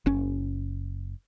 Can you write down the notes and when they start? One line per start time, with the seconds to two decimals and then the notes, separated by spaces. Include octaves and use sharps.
0.06 F#1 C#4